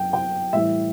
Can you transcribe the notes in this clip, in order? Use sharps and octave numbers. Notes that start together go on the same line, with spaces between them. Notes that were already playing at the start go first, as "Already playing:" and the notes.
Already playing: F#2 G5
G5
A2 E3 G3 E5